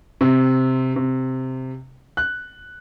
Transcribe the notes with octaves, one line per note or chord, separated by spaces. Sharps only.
C3
C3
F#6